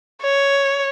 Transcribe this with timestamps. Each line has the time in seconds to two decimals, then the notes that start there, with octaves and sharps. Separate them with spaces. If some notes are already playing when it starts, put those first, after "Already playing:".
0.23 C#5